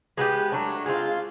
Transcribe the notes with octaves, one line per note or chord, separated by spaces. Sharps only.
G#3 B3 E4 G4
F#3 A3 D4
G#3 C4 F4